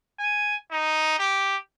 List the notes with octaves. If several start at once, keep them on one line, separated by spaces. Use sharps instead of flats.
G#5
D#4
G4